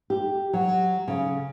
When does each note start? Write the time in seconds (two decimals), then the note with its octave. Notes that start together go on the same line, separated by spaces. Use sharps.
0.10 G4
0.53 F#3
1.08 C#3